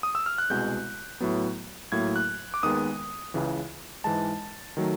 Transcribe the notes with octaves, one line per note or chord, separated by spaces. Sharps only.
D#6
E6
F6
F#6
C2 B2 G#3 G6
A2 F#3 B3
A2 F#3 A#3 G#6
F#6
D6
D#2 D#3 G#3 B3 D#6
C#2 C#3 E3
G#2 E3 G#3 A5
D#3 F#3 A3